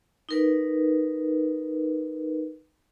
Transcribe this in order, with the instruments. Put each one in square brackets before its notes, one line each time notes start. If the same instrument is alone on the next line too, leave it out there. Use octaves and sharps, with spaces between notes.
[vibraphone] D#4 A#4 B4